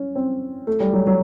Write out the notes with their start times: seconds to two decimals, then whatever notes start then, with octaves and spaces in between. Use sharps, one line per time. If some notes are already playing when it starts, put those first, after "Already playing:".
Already playing: C#4
0.15 C4
0.67 A3
0.80 G3
0.93 F#3
1.07 F#3